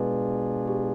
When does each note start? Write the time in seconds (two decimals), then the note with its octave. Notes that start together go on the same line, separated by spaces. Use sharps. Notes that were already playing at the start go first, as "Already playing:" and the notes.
Already playing: B2 G#3 D4 F4 G#4 B4
0.67 G4